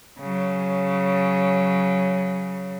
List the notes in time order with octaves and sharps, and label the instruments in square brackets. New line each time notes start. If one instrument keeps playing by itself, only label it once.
[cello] C#3 F#3